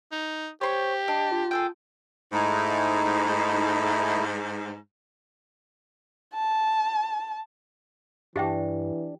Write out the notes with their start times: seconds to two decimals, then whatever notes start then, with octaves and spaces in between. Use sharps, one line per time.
0.12 D#4
0.61 G4 C5 C#5 C6 C#6
1.08 D4 D#5
1.32 F4
1.51 G#4 A4 G5
2.33 G#2 A3 D#4 E4
6.34 A5
8.36 G2 E3 D4 G4 E5 G5